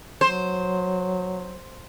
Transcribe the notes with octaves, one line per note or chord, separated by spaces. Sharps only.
F#3 C5